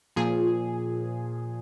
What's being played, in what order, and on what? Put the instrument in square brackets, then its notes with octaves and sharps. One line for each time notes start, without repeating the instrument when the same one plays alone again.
[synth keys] A#2 F3 G#4